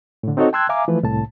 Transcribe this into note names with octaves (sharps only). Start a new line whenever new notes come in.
A2 D3
C4 D#4 F#4 A4 C#5 D#5
G5 A5 C6 E6 F#6 G#6
E5 F5 G#5 A#5 D6
E3 F3 A3 B4
C2 A2 A5